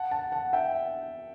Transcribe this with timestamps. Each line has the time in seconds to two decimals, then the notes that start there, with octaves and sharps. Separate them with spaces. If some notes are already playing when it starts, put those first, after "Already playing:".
Already playing: F#5 A5
0.11 F#5 A5
0.32 F#5 A5
0.53 E5 G5